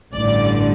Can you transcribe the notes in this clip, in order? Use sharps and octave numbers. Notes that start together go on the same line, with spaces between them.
A1 G2 D3 D5